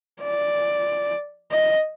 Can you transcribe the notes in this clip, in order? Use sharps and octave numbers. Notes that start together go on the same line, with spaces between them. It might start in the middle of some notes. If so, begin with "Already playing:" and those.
D5
D#5